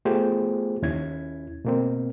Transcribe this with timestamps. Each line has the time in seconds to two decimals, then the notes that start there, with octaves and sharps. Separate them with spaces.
0.05 A3 B3 F4 G4 G#4 C5
0.82 D#2 C#4 E4 G#6
1.65 B2 A#3 C4